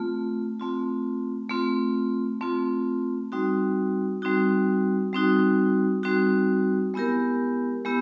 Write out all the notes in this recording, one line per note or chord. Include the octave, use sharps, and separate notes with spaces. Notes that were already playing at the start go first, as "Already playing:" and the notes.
Already playing: A3 C4 F4
A3 C4 F4
A3 C4 F4
A3 C4 F4
G3 C4 D#4 F#4
G3 C4 D#4 F#4
G3 C4 D#4 F#4
G3 C4 D#4 F#4
G#3 B3 E4 G4 A#4
G#3 B3 E4 G4